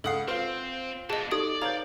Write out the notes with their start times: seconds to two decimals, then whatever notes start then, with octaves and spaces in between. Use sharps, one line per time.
0.04 C#2 A4 F#5 D#6 C7
0.28 C4 F4 B4 C5
1.10 B2 D4 G#4 D#5 A5
1.32 D#4 G4 A4 D5 D#6
1.62 D#4 B4 C#5 F5 A#5 G6